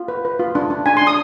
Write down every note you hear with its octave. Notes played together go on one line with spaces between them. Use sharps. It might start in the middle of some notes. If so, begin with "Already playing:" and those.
Already playing: F4
B4
B4
F4
D4
D4
D4 G#5
C6
D4
D#6